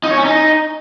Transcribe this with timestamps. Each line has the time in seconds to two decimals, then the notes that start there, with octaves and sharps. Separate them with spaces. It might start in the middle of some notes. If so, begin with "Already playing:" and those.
0.04 D#4
0.11 C#5
0.18 C#4
0.25 D#4